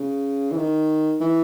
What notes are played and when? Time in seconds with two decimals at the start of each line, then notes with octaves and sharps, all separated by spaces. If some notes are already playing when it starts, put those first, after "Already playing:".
Already playing: C#3
0.51 E3
0.57 D#3
1.20 E3